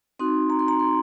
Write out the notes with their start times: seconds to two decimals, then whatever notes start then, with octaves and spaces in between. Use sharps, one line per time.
0.19 C4 D#4 F#4 C6
0.50 A#5
0.59 C6
0.68 A#5
0.80 C6